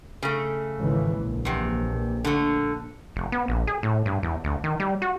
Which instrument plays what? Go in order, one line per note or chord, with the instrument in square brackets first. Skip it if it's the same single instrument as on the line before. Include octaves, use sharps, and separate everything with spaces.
[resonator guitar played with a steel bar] C#3 A3
[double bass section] G#1 C#2 E3
A#1
[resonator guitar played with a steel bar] E2 C3
D3 A3
[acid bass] F1
B3
A#1
G#4
A2
G2
E2
D2
D#3
G3
F#4